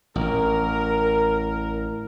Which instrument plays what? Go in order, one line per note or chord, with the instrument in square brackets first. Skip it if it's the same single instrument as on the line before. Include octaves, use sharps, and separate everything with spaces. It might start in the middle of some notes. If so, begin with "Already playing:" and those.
[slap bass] A1 [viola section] A#4